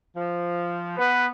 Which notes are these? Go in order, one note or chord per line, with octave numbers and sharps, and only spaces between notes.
F3
B3 B4